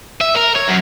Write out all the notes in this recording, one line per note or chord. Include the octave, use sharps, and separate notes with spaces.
E5
A#4
C#5
F#2